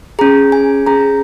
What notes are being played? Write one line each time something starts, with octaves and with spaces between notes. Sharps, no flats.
C#4 G#4 A#5
G#5
C#4 G#4 A#5